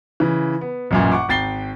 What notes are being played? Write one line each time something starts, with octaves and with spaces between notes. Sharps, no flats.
C#3 E3
B3
A1 F#2 A#2
F#5 C#6 D6
G#1 G5 A6 C7 G7